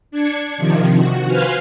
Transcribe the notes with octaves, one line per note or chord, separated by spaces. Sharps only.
D4 G#6 C#7
C3 D#3 F3
F#4
B4 C5 F5 G#5 F6